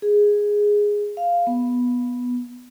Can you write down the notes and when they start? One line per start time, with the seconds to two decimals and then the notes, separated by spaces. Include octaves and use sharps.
0.02 G#4
1.17 F5
1.47 B3